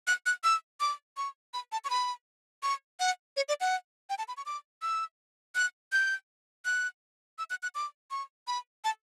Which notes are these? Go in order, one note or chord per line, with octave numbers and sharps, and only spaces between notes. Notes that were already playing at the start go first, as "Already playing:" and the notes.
F#6
F#6
E6
D6
C#6
B5
A5
C#6
B5
C#6
F#5
C#5
D5
F#5
G5
A5
B5
C#6
D6
E6
F#6
G6
F#6
E6
F#6
F#6
D6
C#6
B5
A5